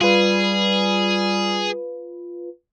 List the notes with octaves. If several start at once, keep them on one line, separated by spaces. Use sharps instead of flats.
G3 F4 G#4 B4